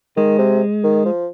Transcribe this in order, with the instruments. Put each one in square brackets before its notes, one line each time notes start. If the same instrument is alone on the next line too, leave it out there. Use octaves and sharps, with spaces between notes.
[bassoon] D#3 [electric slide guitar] G#3
[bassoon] C3
D#3
F3